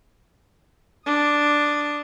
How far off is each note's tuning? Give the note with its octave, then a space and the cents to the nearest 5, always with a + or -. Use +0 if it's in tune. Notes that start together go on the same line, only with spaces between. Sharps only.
D4 +0 D#6 +0